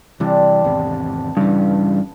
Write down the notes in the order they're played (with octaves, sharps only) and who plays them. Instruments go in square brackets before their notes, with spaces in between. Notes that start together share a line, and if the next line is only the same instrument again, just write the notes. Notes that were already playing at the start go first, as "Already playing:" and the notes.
[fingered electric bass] C3 E3 G3 [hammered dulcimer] F3 C4 D4
[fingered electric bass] G#1 E2 C3 [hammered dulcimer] B3
[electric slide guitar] G2 [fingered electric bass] C#3 E3